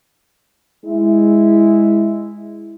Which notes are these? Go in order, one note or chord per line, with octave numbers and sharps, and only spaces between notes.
G#3 E4